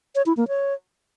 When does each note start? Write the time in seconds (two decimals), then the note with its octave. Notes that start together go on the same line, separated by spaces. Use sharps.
0.15 C#5
0.26 E4
0.37 A#3
0.48 C#5